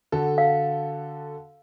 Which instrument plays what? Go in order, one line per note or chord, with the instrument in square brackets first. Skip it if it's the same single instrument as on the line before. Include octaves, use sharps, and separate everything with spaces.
[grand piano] D3 F#4 A4
[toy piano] F5